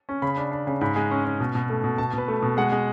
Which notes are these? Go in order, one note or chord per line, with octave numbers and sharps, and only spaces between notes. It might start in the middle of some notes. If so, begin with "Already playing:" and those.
C#4
C#3 B5
D4
D4
C#3
G#2 B5
G#3
C#4
C#4
B2
B2
A3
B2
B2 A5
B2 B4
A3
B2
G#3 F#5
G#3